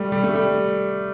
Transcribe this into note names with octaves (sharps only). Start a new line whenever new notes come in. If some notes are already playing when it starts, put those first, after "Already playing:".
Already playing: G3 A3
G3
A3
G3